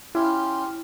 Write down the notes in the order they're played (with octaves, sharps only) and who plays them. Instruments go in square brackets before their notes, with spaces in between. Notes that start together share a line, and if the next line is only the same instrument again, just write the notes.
[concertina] C#4 F4 G4 [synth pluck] E4